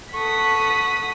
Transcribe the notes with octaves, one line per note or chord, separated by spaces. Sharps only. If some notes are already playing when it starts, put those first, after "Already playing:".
A4 F#5 C#6 D#6 B6